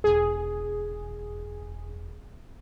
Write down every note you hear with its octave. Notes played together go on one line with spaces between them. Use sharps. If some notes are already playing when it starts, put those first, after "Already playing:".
E1 G#4